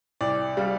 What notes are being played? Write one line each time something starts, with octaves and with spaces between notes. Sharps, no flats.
C2 D5
G3 F5